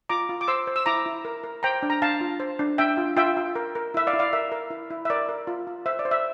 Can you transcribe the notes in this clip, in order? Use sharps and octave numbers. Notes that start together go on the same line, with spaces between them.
F4 A#5 D6
F4
D6
C5 C6 E6
C5
E6
E4 A#5 D6
E4
A#4
A#4
C5 G5 A#5
D4
A#5
D4 F5 A5
F4
C5
D4
D4 E5 G5
F4
F4 E5 G5
F4
A#4
A#4
E4 E5
D5 F5
E4
D5 F5
A#4 E5
A#4
E4
E4
E5
A#4 D5
A#4
F4
F4
C5 E5
D5
C5
E5